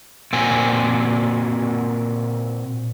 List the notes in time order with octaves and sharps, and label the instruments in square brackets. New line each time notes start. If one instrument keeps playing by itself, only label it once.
[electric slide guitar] A#2 C4 F#4 G#5